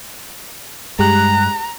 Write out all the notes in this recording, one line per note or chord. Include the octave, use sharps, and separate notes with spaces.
G2 G#3 G4 A#5 F#6